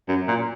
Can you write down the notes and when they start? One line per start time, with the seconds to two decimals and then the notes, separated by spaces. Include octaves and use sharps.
0.08 F#2
0.28 A#2